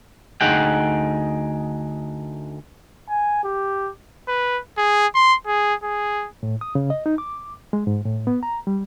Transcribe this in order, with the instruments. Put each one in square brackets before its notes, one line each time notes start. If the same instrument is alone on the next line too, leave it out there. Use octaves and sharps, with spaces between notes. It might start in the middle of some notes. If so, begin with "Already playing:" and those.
[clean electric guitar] D2 D#4 G#4 F#5 G5
[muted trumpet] G#5
G4
[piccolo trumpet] B4
G#4
C6
G#4
G#4
[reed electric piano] A2
D#6
C#3
D#5
D#4
D6
G#3
G#2
A2
B3
A#5
G3